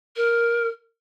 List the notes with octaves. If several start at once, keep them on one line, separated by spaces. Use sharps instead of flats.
A#4